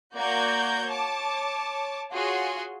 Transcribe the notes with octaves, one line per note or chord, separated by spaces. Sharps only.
A#3 F#4 D5 A#5 G6 G#6
C#5 A5 D6
F4 F#4 G#4 C#5 C6